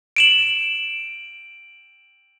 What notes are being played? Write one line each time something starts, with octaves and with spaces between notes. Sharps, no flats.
D7 E7 F#7